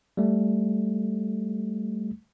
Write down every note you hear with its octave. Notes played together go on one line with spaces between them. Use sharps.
G3 A3